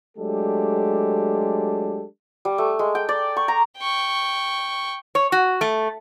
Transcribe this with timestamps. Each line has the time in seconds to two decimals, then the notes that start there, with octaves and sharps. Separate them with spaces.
0.17 F#3 G#3 A3 D4 G4 A4
2.45 G3
2.58 A3
2.79 G#3
2.95 G5
3.09 D5
3.37 C#6
3.48 A#5
3.78 G5 C#6
5.15 C#5
5.32 F#4
5.61 A3